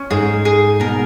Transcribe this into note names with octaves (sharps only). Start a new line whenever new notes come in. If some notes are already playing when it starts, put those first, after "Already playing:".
Already playing: C#4
G#2 G#4
G#4
B2 A#4